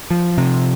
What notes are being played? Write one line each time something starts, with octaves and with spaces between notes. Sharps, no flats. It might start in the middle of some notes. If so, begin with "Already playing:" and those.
F3
C3